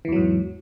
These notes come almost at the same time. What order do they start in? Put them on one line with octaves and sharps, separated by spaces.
E3 E2 F#3 G#2